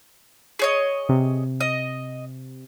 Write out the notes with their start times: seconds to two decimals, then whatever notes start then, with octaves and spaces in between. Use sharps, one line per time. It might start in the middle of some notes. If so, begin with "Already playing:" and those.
0.59 G#4 C#5 D#5
1.09 C3
1.61 D#5